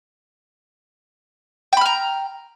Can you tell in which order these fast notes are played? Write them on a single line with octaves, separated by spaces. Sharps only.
G5 B5 F6 A#5